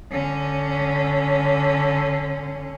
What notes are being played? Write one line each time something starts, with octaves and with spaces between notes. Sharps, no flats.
D3 C#4